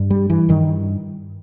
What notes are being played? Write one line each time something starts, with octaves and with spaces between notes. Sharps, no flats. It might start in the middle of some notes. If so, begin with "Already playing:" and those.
Already playing: G2
G3
E3
G2 D#3